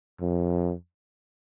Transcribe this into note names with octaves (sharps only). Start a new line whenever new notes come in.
F2